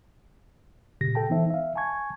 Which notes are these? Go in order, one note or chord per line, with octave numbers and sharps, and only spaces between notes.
A#2 C#3 G4 A#6
A4 G5 A5
E3 B3 D#4 C5 E5
E5 F5
G#5 A5 C#6 G#6